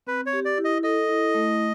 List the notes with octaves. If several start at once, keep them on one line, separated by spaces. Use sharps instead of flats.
C4 B4
C#5
G4
D5
E4
D#5
A4 D#5
E4
A3